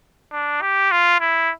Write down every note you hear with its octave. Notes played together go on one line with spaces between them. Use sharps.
D4
G4
F4
E4